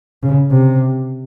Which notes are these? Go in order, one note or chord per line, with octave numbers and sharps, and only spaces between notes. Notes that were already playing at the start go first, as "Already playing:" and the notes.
C#3
C3